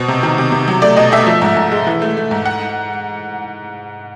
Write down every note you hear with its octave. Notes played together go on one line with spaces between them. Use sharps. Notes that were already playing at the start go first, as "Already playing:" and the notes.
Already playing: B2 C5
C3
D#3
C3
C3
F#3
A3 D5
B2 D#5
A3 E5
F3
G#2
G#2
G#3
E3
A3
A3
G#2
F#5